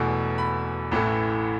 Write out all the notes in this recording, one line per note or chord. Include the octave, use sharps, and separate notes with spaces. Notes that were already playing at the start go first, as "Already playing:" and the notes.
Already playing: E1 E2 B2 A3 G#5
B5
A1 A2 E3 A3